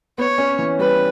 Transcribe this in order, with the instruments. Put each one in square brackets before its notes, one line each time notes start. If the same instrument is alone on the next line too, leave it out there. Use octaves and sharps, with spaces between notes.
[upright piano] B3 [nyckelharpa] C#5
[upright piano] C#4
E3
[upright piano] G3 [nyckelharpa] B4